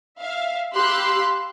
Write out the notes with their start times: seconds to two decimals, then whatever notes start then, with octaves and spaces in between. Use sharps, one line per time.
0.20 E5 F5
0.75 G4 F5 B5 C6 E6 F#6